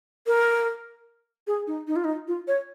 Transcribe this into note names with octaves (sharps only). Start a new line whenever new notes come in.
A#4
G#4
D#4
D#4
F4
D#4
F4
C#5